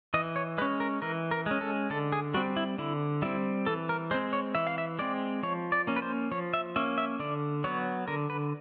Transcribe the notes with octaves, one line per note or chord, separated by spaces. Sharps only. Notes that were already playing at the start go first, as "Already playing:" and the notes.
E3 D#5
C#5
G#3 C#4 B4
A#4
E3 A#4
A#4
G#3 C#4
A4
D3 A4
G#4
G3 C4 F#4
E4
D3 E4
G3 C4 E4
E3 A4
A#4
G#3 C4 C5
C#5
E3 E5
F5
E5
G#3 C4 D5
F3 C#5
D5
A#3 C#4
B4
C5
F3 C#5
E5
A#3 C#4 E5
E5
D3 D5
F#3 B3 C#5
D3 A#4
B4